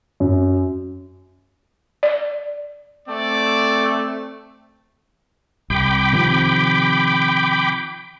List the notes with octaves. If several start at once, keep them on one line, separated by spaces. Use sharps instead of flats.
F#2
D5
A3 C4 D5
C2 G5 B5 D6
C3 D#3 F3